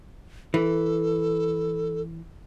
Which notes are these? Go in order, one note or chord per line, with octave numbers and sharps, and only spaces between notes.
E3 A4